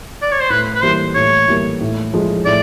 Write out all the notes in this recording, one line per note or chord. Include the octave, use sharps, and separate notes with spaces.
D5
C#5
C5
A2 B4
B4
E3 G3 A#3 C5
A2 C#5
E3 G3 A#3
A2
F3 G#3
A2 D5